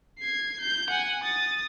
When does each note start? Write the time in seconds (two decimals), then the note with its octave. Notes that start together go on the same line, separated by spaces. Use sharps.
0.19 G#6 C7
0.60 G6
0.90 F#5 G#5
1.23 D#6 A6